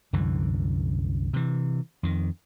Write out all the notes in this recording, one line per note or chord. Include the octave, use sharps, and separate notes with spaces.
C2 F#2 D3 E3
C3 E3
F2 D#3